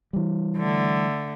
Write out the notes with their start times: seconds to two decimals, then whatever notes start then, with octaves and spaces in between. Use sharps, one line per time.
0.13 E3 G3
0.58 D3 A3